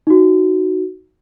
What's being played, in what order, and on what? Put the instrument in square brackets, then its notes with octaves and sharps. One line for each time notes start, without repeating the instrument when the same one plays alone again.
[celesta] D#4 F#4